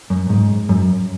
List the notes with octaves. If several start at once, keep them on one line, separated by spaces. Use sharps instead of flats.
F#2
G#2
F#2